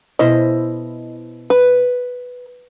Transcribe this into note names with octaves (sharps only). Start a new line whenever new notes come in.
B2 E4 C5 D#5
B4